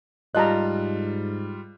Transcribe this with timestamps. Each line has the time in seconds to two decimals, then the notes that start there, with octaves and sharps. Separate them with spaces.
0.35 G#2 G3 F4 D#5 A5 A#5 F#6